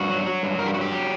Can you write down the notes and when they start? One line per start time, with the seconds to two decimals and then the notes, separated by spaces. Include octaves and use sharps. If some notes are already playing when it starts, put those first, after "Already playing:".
Already playing: G2 F#4
0.09 F#3
0.26 F#3
0.43 G2
0.59 G2 A#4
0.66 G4
0.74 F#3 F#4
0.81 G4
0.92 F#3